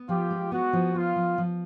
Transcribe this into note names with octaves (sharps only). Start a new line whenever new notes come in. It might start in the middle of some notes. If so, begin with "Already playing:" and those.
Already playing: B3
F3 F4 G4
G#3
B3 F#4
F3
B3 F4
F3
F3